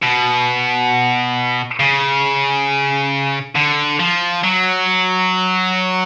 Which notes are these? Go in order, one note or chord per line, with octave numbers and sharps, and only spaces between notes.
B2
C#3
D3
F3
F#3